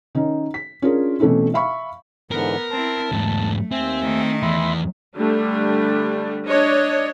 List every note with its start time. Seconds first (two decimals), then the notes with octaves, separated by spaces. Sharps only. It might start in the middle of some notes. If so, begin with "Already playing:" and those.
0.15 D#3 C#4 D#4
0.54 B6
0.82 C#4 D4 F4 G#4 A#4
1.20 B2 E3 A3 C4 C#4 E4
1.54 E5 F5 B5 C#6
2.31 G#2 D3 E3 B3 A#4
2.71 C4 E4 A5
3.12 E2 G#2 A3
3.71 D#2 C4 E5 G#5
4.01 D#3 A3
4.43 E2 E5 B5 C6
5.16 D3 G3 A3 D4
6.48 D4 C#5 D#5